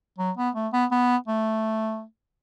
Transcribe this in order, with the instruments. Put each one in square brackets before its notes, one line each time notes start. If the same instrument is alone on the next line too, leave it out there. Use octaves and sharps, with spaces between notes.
[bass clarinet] F#3
B3
A3
B3
B3
A3